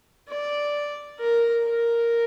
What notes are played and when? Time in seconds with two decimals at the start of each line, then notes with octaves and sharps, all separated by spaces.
0.29 D5
1.20 A#4
1.66 A#4